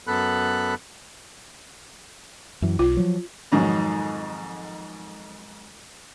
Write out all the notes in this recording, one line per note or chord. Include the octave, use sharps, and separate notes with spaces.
F#2 B3 A4 B5 F#6
F#2 E3
B1 F4
F3 F#3
F2 G#2 D#3 F#3